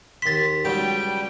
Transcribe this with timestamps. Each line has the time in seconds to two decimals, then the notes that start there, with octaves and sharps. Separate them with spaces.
0.22 D#2 C6 A6 B6
0.65 C#2 F#3 G3 G5 A5